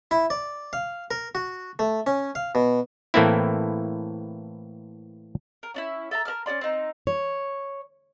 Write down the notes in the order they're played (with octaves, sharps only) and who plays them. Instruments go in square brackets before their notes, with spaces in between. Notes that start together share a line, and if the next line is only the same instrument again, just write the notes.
[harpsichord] E4
D5
F5
A#4
F#4
A3
C#4
F5
B2
[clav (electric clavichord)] A2 E3 A3 A#3 C4 E4
[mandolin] A#4
C#4 D4 E4
A4 E5 A5 A#5
A#4 B4 A5 F6
C#4 F#4 D5 C6
C4 D#4
[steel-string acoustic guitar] C#5